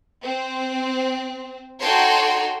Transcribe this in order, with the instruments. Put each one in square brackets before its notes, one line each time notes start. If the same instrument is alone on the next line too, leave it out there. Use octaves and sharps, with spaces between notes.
[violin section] C4
D#4 F#4 A4 C#5 G5 C6